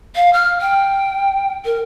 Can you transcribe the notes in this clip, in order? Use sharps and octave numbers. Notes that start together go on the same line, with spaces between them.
F5
F6
G5
A#4